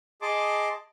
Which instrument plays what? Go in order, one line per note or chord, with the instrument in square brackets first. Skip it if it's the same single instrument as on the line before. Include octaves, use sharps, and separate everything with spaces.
[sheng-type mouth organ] G#4 D#5 A5 C6 D6